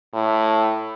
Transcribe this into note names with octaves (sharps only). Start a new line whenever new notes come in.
A2